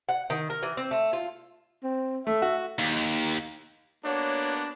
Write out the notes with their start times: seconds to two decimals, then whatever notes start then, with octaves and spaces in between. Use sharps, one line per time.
0.09 F#5
0.30 D#3
0.50 A#4
0.63 E3
0.77 C4
0.91 A3
1.13 F4
1.83 C4
2.27 A3 E5
2.42 F#4
2.78 D#2
4.05 A#3 B3 D4 F#4 C#5